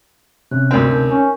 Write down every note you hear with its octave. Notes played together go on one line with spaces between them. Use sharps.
C3 C#4 F#6
D2 C4 F#4 A#4 F7
D#4 A#4 G6
C#4